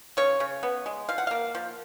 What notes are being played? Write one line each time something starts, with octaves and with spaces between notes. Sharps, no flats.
C#3 C#5
C#3
B3
G#3
F3 F5
F#5
A#3 F5
F3